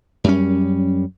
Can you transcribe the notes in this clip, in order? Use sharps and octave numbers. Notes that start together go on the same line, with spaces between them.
F#2 G3 C#4